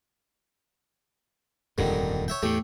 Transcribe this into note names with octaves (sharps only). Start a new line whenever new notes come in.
D#1 F2 G#2 D3 D#3 G3
C#5 E5 G5
E2 A2 A3 G4